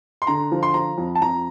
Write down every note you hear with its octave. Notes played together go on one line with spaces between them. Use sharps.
C6
D3 A#5
F3
C6
F3 A#5
F2
A5
F2 A#5